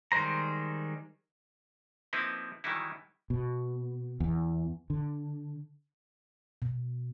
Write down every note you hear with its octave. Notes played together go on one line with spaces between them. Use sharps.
D#3 G3 G#3 C5 A#5
F3 A#3 C4 D#4 E4 B4
D#3 E3 F#3 G3 D#4 E4
B2
E2
D3
B2